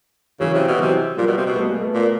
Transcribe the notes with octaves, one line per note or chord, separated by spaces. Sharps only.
C#3 E3 F#3
C3
B2
C3 E3 F#3
A#2 F3 G3
B2
C3
B2
G3 A3
G#3 A#3
A3 B3
A#2